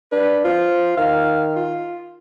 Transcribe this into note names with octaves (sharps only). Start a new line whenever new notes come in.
D4 B4
C4 F4
D#3 F5
F4